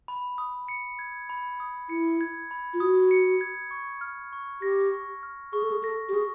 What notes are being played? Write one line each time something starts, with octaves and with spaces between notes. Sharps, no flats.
B5
D#6
C#7
G#6
B5
D#6
E4 C#7
G#6
B5
F4
F#4 D#6
C#7
G#6
C#6
F6
C#6
G4 A#6
C#6
F6
G#4 C#6
A4
G#4
A4 A#6
G4
G#4 C#6